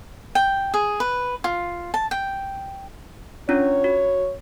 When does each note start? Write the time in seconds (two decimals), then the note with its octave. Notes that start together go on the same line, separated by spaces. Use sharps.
0.35 G5
0.74 G#4
1.00 B4
1.44 F4
1.94 A5
2.11 G5
3.49 C#4 D4 F4 C#5
3.84 F#4